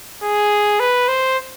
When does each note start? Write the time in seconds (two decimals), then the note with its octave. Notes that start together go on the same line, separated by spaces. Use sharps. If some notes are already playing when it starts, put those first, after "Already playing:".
0.23 G#4
0.80 B4
1.08 C5